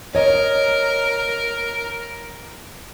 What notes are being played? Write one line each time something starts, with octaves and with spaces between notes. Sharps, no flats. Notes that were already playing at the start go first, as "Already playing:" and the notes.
A#4 C#5 D#5